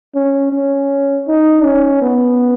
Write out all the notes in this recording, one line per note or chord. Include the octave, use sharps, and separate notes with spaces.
C#4
C#4
D#4
C#4
B3